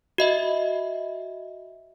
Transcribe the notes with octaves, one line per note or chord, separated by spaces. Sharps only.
F#4 D#5 E5